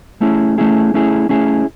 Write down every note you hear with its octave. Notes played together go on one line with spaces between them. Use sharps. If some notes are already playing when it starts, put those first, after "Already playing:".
A3 C#4 E4 G#4
A3 C#4 E4 G#4
A3 C#4 E4 G#4
A3 C#4 E4 G#4